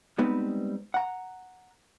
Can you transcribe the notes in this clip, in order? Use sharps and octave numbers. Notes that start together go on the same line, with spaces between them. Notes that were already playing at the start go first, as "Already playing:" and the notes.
G3 G#3 B3 C4 D#4 B4
F#5 A#5